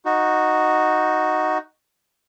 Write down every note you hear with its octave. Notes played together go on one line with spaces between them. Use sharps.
D#4 F#4